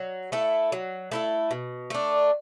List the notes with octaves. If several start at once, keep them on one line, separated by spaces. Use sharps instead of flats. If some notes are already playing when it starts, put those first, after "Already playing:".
Already playing: F#3
A3 E4 A4
F#3
A3 E4 A4
B2
A3 D4